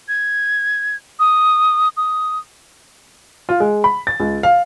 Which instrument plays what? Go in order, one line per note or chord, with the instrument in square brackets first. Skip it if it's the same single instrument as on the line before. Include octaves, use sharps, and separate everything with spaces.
[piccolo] G#6
D#6
D#6
[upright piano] F4
G#3
B5
A6
C#2
F5